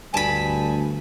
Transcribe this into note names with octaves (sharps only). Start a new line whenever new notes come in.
D2 G2 G#5 A5 B5